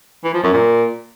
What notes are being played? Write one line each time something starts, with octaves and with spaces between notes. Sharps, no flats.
E3
F3
F#2
A#2